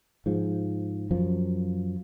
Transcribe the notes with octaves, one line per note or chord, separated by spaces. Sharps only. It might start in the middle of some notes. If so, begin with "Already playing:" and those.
G#2 F3
F#2 F3